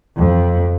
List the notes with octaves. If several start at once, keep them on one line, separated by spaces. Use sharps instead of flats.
F2